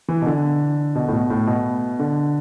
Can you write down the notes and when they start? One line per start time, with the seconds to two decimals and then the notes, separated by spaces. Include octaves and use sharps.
0.08 E3
0.22 B2
0.26 D3
0.95 B2
1.08 A2
1.13 B2
1.30 A2
1.47 B2
1.99 D3